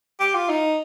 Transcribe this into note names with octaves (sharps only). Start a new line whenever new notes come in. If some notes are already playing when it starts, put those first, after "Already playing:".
G4
F4
D#4